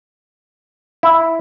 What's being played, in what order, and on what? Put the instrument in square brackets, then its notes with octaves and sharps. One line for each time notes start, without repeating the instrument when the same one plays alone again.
[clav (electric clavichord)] E4